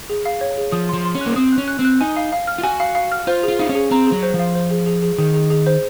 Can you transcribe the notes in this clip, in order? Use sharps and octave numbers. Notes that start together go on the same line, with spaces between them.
G#4
F5
C#5
G#4
F3 D#6
F3 C6
C6
C#4
A#3 F#6
C4 D#6
F#6
C#4
F#6
C4
F#6
D#4 G#5
F5
F5
F6
F4
F#4 G#5
F5
F5
F6
F4 C5
F4 G#4
D#4 F5
C#4
G#4
C4 A#5
G#4
F#3
C5
F3
F5
C5
G#4
G#4
G#4
D#3 G#4
G#4
G#4
C5